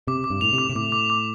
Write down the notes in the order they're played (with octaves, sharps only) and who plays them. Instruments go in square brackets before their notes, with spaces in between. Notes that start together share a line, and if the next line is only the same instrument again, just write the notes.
[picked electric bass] C3 [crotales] D6
[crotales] D6
[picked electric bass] G2
[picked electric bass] A2 [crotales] F7
[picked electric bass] C3
[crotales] D6
[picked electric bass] C3
[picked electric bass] A2 [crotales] D6
[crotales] D6
D6